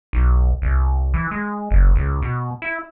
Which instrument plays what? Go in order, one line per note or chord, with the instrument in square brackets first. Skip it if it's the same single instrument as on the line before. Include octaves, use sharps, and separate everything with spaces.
[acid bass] B1
C2
E3
G#3
F#1
C#2
B2
E4